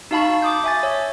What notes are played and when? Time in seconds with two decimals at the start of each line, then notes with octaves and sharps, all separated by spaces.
0.11 D#4 F#4 F5 A5 B5 C#6
0.42 D6 D#6 G6
0.64 E5 G#5 A6
0.83 C#5 E5